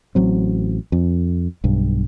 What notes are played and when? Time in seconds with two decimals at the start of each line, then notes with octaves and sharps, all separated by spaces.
0.15 A1 F#3 C4
0.92 F2
1.64 B1 G2